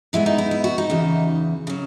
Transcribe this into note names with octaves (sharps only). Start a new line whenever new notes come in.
B2 G#3 B3 E4
D#4
E4
E4
F#4
D#4
E2 C#3 E3
C#3 F#3